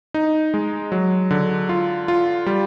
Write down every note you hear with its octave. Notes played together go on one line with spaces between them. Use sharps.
D#4
G#3
F#3
D3
F4
F4
G3